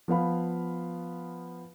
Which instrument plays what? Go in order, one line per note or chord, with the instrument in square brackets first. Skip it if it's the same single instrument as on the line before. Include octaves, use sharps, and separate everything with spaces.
[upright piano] F3 B3 F5 B5